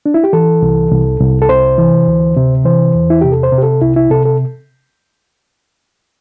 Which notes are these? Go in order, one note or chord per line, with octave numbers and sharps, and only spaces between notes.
D4
E4
G4
E3 A4
C2
C2
C2
A4
C3 C5
E3
D2
C3
E3 C5
E2
E4
C3 G4
A4
C5
C3
G4
A4
C2 E4
E4
C3 A4
A4